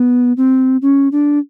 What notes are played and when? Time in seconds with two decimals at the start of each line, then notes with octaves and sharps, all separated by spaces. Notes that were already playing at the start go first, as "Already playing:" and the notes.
Already playing: B3
0.37 C4
0.82 C#4
1.12 D4